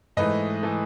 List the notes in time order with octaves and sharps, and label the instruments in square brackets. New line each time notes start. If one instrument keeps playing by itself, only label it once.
[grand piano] G#2 E3 A3 B4 D#5
E3 A3